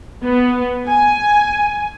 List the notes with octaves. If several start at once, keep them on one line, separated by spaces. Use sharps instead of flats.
B3
G#5